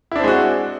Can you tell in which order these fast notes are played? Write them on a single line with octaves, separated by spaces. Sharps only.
E4 D4 C4 G#3 F#4